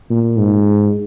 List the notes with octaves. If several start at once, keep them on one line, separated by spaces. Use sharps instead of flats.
A#2
G#2